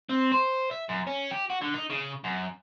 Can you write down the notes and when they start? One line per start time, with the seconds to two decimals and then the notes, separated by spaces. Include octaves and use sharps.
0.09 C4
0.32 C5
0.71 E5
0.89 F#2
1.07 C#4
1.31 G4
1.50 F#4
1.62 D3
1.74 D#4
1.90 C#3
2.24 F#2